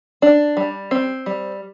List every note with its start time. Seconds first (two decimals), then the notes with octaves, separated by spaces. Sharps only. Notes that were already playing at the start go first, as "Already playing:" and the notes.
0.22 D4
0.57 G3
0.91 C4
1.26 G3